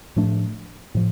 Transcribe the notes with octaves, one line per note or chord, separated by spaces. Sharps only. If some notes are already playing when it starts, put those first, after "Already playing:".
A2 F3 A3 D4
A2 F3